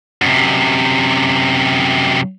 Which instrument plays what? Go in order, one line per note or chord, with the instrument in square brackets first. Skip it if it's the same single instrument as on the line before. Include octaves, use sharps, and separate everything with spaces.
[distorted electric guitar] F#2 C3